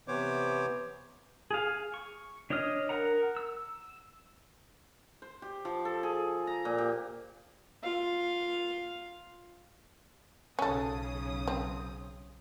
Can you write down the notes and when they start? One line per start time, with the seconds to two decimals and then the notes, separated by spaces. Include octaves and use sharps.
0.08 C3 E3 B3 C5 C#5 D6
1.51 G#4 F5
1.94 C#6
2.50 D4 C#5 D#5 D#6 F6
2.89 A#4 F#5 A#5
3.36 E6
5.22 C5
5.42 G4
5.65 F3
5.85 A4
6.03 G#4
6.47 A#5
6.65 A#2
6.78 G4
7.83 F4 F5
10.59 B1 C#3 C#4 A4 D#6
11.48 C4